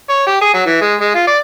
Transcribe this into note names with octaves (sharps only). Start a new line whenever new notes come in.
C#5
G4
G#4
F#3
E3
G#3
G#3
F4
D5